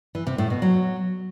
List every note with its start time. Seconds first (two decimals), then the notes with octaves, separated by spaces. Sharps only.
0.15 E3
0.27 C3
0.38 A2
0.50 B2
0.62 F#3